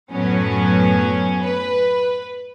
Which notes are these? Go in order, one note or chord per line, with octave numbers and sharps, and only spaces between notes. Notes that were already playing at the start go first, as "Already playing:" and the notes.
F#2 A2 F#3 B3 C#4
B4